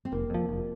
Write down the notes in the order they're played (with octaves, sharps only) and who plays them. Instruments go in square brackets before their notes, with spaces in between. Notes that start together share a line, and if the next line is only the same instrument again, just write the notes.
[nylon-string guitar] C4
[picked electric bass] F1 [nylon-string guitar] A#3
[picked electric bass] F2 F3
F1